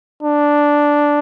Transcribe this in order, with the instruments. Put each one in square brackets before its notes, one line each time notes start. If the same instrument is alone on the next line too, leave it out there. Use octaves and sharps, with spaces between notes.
[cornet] D4